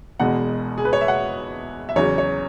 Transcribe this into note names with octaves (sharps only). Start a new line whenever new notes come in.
E1 E2 B2 G#3 F#5
G#4
B4
C#5
E5
F#5
E5
E2 C#3 F#3 C#5
C#5